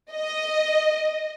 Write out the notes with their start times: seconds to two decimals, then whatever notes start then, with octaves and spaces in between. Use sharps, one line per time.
0.12 D#5